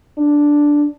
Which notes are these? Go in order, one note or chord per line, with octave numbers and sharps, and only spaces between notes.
D4